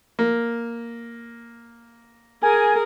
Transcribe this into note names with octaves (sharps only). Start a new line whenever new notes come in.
A#3
G#4 A#4 G#5